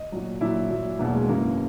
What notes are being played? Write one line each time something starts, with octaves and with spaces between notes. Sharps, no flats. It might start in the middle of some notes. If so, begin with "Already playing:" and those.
Already playing: D#5
A#2 F#3
A#2 F#3 E4
A#2 F#3
E2 B2 F#3 A#3
G#3
F#2 C#3 E3 A#3